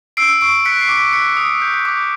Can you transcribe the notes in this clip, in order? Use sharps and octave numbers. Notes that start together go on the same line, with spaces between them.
E6 C7 D7
C#6 C7 D7
F#6 B6 C#7
C7
D6
B6
F#6 B6 C#7
D#6
G6
D6